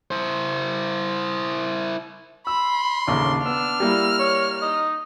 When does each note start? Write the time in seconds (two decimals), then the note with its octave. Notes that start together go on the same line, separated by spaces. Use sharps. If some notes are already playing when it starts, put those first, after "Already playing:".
0.11 E4 C5
2.47 B5 C6 E6
3.07 A1 D#2 C#3 D4
3.46 B3 E6 F6
3.80 G3 A#3 E4 E6
4.19 A#4 C#5
4.62 D#4 D#5